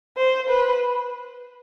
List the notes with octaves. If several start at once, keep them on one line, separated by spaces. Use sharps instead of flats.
C5
B4